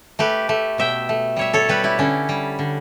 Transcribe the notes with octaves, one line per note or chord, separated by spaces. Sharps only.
A3 G4 B4
A3
B2 E5 G5
A3
G3 C#5 E5
A4 C#5
G3 G4 B4
E4 G4
D3 C#4 E4
G3
D3